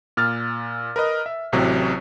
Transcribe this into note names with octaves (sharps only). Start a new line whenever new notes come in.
A#2 F6 A6
A#4 B4 D#5
E5
A1 A2 C3 F#3